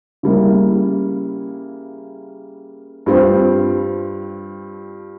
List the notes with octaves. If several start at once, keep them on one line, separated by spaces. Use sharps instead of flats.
C#3 G3 A#3 E4
G2 G3 C4 F4